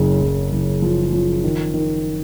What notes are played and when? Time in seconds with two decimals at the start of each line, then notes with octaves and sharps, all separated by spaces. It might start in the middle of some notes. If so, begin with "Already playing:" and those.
Already playing: F#1 C#3
0.21 F#1
0.52 F#1
0.82 F3
1.12 F3
1.44 D#3
1.74 D#3